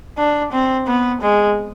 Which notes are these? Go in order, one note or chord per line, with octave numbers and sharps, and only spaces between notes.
D4
C4
B3
G#3